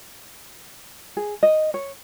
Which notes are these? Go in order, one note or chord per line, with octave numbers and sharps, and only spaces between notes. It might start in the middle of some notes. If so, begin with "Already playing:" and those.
G#4
D#5
C#5